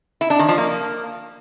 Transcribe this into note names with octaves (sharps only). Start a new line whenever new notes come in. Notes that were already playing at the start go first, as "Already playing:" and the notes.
E4
D4
D#3
F3
A#3